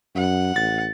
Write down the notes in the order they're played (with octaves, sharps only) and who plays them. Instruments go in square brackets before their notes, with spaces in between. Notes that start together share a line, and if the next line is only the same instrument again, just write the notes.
[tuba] F#2 [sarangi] F#5
[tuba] A1 [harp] A6